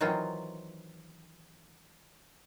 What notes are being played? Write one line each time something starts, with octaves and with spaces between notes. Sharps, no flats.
D#3 E3 F#3 C4 F4